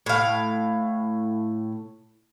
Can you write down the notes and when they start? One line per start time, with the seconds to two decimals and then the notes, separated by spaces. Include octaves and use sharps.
0.06 A2 F5